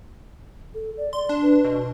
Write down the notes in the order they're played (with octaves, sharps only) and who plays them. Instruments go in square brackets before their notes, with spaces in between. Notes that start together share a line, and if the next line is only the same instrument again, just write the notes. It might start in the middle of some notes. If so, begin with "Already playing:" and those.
[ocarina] A4
D5
[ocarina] D5 [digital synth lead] C6
[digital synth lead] D4
[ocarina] B4
[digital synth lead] B2